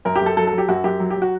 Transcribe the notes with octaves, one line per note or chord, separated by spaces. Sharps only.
F#2 A#4
G4
F#2 A4
F#3 A4
A4
F#3
G4
F#2 F#4
F#2 G4
F#3
G4
F#3
F#4